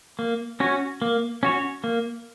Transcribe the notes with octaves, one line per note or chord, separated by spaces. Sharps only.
A#3
C#4 F#4 C#5
A#3
C#4 F#4 C#5
A#3